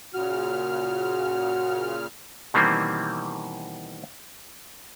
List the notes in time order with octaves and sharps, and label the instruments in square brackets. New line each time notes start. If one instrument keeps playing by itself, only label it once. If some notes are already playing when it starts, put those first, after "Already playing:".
[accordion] A#2 C#3 F6 [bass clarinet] F#4
[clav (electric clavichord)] B2 D#3 E3 G3 A#3 C4